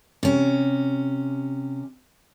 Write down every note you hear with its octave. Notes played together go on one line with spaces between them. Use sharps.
C3 C#4